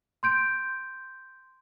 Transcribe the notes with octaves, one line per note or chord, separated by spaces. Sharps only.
C6 G6 D7